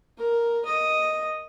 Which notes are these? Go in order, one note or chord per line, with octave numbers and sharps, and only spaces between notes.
A#4
D#5